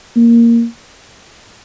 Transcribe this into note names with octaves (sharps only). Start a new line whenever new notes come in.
A#3